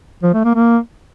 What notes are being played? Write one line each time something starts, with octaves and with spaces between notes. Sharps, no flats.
F3
A3
A#3
A#3